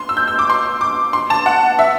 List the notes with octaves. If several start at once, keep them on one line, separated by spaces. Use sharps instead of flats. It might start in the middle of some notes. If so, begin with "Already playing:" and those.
Already playing: C6
E6
G6
E6
D6
C6
D6
C6
A5
F#5
E5